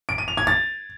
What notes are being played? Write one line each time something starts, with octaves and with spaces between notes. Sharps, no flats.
D7
D#7
F7
G#6
A6